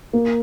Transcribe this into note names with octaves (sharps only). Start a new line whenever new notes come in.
A#3